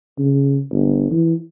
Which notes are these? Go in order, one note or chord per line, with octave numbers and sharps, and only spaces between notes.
C#3
G1
E3